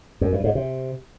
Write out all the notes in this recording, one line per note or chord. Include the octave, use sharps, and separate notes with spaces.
F#2
G2
G#2
C3